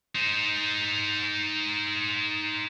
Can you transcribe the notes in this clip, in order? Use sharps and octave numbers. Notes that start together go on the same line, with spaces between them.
D#4 C5